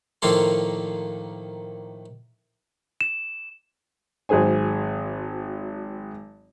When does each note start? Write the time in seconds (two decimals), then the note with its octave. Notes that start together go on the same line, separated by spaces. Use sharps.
0.22 A2 D#3 F3 A#3 A4 C6
3.01 E7
4.29 G#1 F#3 G#4 C5 G#5